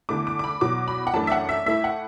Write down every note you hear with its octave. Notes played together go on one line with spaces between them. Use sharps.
E2 D3 A3 E4 D6
D6
D6
B5
E2 B2 F#3 D6
B5
F#5
F#2 E3 A3 D4 A5
E5
F#5
E5
A2 A3 E4 E5
F#5